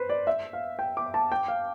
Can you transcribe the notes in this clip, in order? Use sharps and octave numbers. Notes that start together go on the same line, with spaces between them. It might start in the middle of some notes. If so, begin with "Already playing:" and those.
Already playing: B4 C5
D5
E5
F5
G5
D6
A5
G5
F5